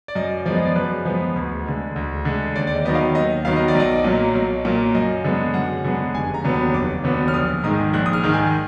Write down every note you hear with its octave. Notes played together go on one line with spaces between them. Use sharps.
D5
F#2 D#5
F3 G#3 B3 D5
D#5
D5
F#2 B4
F3 G#3 B3
D2
D3 G#3
D2
D3 G#3
D#2 D5
D5
D#5
D#3 F#3 B3 D#5
F5
D#2 D#5
D#3 F#3 B3 F5
D#5
D5
B1
D#5
A#2 F#3 A#3
B1
A#2 F#3 A#3
F#2 D#5
D3 G#3 B3
F#2 F#5
D3 G#3 B3
F1 G#5
A#5
D#2 D3 F#3 B3
B5
F1 D6
D#2 D3 F#3 B3
F6
A#1 D#6
G#2 D#3 G#3 D#6
A#1 F#6
D#6
F6
G#2 D#3 G#3
G#5